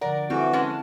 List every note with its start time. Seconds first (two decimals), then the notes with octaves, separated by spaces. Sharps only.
0.01 D3 F3 A#4 D5 F#5
0.30 E3 G3 C4 E4 F#4 A4
0.53 G#3 C#4 A5